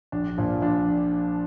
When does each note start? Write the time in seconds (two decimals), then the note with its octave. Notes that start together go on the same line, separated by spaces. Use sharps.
0.12 A#1 D4
0.38 A#2 F3
0.62 A#1 D4